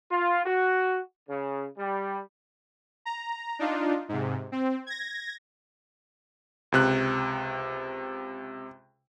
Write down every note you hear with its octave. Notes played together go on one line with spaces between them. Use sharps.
F4
F#4
C#3
G3
A#5
D4 D#4 F4
G#2 C3
C4
G#6 A#6
C#2 C3 F#6